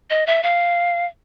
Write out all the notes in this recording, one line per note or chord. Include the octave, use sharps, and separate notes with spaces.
D#5
E5
F5